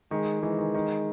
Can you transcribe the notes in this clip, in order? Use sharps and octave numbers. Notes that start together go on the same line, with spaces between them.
D#3 G#3
E3 G#3
D#3
D#3